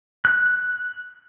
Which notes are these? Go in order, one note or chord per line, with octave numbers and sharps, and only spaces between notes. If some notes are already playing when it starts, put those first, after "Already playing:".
F#6